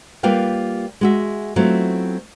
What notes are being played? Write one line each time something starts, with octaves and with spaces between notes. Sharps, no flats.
G3 A#3 F4 B4 F5 G5
G#3 F#4 E5
F#3 A3 B3 C4 E4 F4